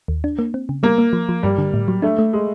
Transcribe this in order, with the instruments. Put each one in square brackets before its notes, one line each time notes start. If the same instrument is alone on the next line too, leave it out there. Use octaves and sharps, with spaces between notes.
[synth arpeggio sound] D#2
D4
A#3
C4
C#3
[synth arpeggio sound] G3 [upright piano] A#3
[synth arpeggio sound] A#3
F3
F3
[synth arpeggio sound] G2 [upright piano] G3
[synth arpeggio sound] D3
A2
F#3
[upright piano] A3 [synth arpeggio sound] D4
[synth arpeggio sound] A3
[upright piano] G#3